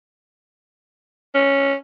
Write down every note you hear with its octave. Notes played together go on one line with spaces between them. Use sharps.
C#4